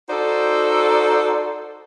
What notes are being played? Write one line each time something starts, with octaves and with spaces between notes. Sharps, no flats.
D#4 F#4 A4 C5 D5